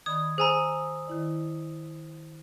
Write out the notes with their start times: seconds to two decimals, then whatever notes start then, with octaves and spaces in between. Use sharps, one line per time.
0.06 D#3 D5 B5 D#6 G#6
0.38 G#4 C5 G#5 A#5 D#6 E6
1.07 D#3 E4 D5